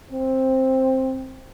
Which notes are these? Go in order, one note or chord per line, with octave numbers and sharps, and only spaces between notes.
C4